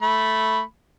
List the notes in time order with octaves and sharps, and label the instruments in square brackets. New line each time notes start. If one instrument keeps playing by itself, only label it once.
[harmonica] A3 B5